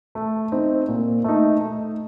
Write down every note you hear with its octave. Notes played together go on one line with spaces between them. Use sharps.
A3
C4 D#4
A#2
A3 D#4
A3